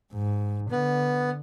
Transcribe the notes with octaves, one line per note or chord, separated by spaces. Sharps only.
G#2
D3 B3